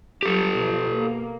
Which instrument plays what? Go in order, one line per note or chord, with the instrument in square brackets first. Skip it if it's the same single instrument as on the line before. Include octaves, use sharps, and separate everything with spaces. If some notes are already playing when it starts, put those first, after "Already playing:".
[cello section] F#3 G3 [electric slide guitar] G4 A4
[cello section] B2 F3
A#3